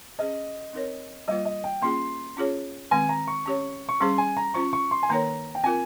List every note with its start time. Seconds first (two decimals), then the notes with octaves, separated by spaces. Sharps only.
0.19 C#4 G#4 C5 D#5
0.73 C4 D#4 A#4 C#5
1.28 G3 A#3 F4 C5 D#5
1.45 D#5
1.64 G5
1.82 A#3 C#4 F4 G#4 C6
2.37 C#4 F4 G#4 C#5
2.91 D#3 G#3 C4 G#5
3.09 A#5
3.28 C#6
3.46 C#4 G4 C#5
3.89 C#6
4.00 G3 C#4 G#4 C5 C6
4.18 G#5
4.37 A#5
4.54 C#4 F4 C5 C#6
4.73 C#6
4.91 C6
5.03 G#5
5.09 D#3 A#3 D#4 A#4 C#5 A#5
5.55 G5
5.64 C4 F4 A#4 G#5